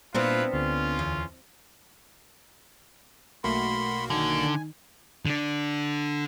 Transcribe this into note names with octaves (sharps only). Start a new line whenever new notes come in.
A#2 B3 C4 D4 E4 F4 B4
D2 D3 C#4 F4
E2
B1 A3 A#3 F#4 B5 C6
D3 D#3 G#5
D3 D4